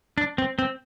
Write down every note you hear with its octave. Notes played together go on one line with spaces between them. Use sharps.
D4
C4
C4